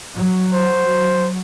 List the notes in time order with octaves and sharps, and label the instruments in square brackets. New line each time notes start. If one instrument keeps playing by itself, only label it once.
[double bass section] F#3
[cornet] C5